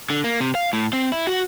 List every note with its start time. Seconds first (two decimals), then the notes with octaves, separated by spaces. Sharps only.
0.10 D3
0.24 A#3
0.40 C3
0.55 F5
0.73 A2
0.93 C4
1.12 E4
1.27 F#4